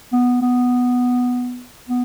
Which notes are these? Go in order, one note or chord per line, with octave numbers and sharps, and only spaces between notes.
B3
B3
B3